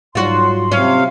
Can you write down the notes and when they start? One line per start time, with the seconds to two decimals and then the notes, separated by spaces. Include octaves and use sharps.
0.15 G#2 F#3 G3 F4 F#4 C6
0.72 C3 C#4 F5